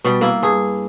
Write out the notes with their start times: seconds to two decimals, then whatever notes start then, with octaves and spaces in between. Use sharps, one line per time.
0.04 B2 G3
0.21 A#3 E4
0.43 G2 G#4